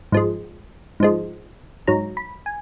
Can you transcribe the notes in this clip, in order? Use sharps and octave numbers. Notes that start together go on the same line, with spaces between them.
G#2 F3 G#3
G#2 F3 G#3
G#2 F#3 A#5
B5
G#5